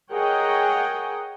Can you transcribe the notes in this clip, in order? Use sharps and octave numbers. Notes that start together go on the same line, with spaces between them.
G#4 A#4 C#5 D#5 F#5 G5